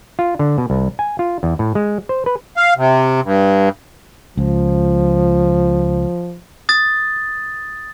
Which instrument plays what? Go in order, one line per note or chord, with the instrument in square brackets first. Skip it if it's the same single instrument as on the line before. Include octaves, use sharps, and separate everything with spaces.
[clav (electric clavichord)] F4
D3
B2
C2
G#5
F4
E2
A2
G#3
C5
B4
[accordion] F5
C3
G2
[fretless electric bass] C#2 [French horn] F3
[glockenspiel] D#6 A6